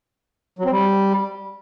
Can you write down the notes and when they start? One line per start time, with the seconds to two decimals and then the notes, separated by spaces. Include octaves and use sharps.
0.59 F#3
0.65 C4
0.71 G3